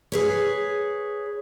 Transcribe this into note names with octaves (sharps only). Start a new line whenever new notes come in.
G#4 B4 C#5